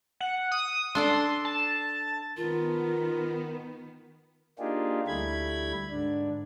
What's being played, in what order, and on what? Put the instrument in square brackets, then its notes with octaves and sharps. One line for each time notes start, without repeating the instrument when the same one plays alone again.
[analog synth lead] F#5
D#6
[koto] D4 A4 D5 [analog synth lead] C6
[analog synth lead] A5
[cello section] D#3 B3 [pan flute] F4 [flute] A#4
[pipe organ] A#3 D4 D#4 F4 G4 G#4
D2 G3 A3 E4 B5 G#6
G#2 D3 D4